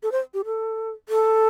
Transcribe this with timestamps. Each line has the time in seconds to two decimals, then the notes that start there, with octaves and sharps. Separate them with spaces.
0.03 A4
0.12 C5
0.34 G4
0.45 A4
1.09 A4